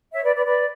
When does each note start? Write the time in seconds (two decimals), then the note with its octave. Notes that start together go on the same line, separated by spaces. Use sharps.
0.13 C#5 E5
0.24 B4 D5
0.34 B4 D5
0.46 B4 D5